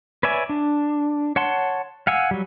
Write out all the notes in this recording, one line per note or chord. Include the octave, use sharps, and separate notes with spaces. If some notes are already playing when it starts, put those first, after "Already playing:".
B4 C#5 D5 E5 G#5
D4
C#5 F#5 A5 C6
F5 F#5 G#5 E6
F#3 G3